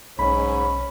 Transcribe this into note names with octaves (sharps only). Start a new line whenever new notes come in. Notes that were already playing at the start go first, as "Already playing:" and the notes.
B1 G#2 C#4 B5